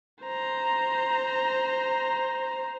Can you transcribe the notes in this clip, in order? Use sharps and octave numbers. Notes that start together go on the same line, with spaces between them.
C5 A#5